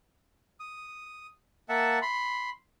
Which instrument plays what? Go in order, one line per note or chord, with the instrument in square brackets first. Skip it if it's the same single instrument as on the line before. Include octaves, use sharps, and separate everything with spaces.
[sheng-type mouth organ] D#6
A#3 E5 F#5 A5
B5 C6